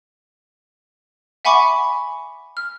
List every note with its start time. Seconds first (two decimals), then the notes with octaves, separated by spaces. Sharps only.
1.45 E5 F#5 G#5 B5 C#6 D6
2.57 F6